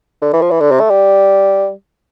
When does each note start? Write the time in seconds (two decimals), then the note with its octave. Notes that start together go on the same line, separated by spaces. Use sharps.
0.22 D3
0.33 E3
0.41 F3
0.51 E3
0.60 D3
0.71 C3
0.80 A3
0.90 G3